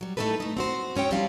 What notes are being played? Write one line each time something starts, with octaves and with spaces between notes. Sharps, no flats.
F#3 G3
A2 A3 D4 D#4 A4 B4
A3 D#4
C4 F#4 C5
G#2 C#4 C#5 G5
F3 G3 C4 D4 E4 F5